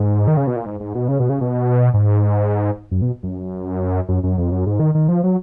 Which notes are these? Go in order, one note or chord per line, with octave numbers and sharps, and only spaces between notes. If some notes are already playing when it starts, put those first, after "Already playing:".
Already playing: G#2
D#3
C#3
B2
A#2
G#2
G#2
B2
C#3
B2
C#3
B2
G#2
F#2
B2
F#2
F#2
F#2
F2
F#2
G#2
D#3
D#3
F3
F#3